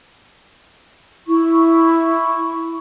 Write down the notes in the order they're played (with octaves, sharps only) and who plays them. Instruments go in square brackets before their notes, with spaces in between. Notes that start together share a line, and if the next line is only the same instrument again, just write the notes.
[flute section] E4 C#6